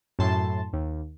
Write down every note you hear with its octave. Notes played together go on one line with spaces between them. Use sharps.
F#2 A2 A5 C6
D#2